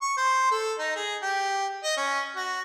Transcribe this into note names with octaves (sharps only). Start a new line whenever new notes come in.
C#6
C5
A4
D#4
G#4
G4
D#5
C#4
F#4